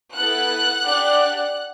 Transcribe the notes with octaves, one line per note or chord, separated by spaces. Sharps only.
B3 E4 A4 F#5 F#6
D4 G4